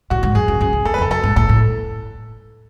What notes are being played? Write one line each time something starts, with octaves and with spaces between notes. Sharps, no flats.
A2 F#4
G#2
F#2 G#4
F#2
F#2 G#4
E2
E2 A4
B4
E2 A4
F#2 A4
G#2
A2 A4
A2